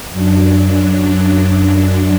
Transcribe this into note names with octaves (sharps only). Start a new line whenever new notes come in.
F#2 F#3 D4